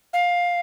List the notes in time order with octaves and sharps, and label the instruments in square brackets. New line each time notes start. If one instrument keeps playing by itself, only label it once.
[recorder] F5